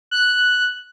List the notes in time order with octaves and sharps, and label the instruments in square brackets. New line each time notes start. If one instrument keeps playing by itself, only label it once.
[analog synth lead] F#6